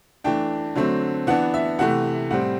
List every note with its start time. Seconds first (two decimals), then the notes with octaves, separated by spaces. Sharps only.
0.24 E3 A3 D4 G5
0.76 D3 F#3 A3 C4
1.27 E3 B3 D4 F#5
1.54 E5
1.79 C3 E3 A3 F#5
2.30 A2 G3 C4 F#5